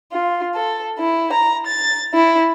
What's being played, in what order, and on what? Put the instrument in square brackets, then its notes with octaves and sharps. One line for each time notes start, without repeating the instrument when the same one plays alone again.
[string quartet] F4
A4
E4
A#5
A6
E4